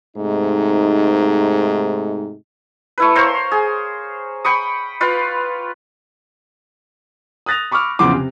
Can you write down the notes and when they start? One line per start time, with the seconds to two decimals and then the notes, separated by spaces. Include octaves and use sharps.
0.17 G#2 C3 A3 D#4
2.98 A3 E4 B4
3.15 A#4 C5 C#5 F5
3.52 G#4
4.45 G5 B5 C#6 D#6
5.01 F4 B4 F5 G5
7.46 D#6 F#6 A6 A#6 F7
7.72 B5 C#6 D6 E6 F6
7.99 E2 C#3 F3 C6 D6
8.13 C3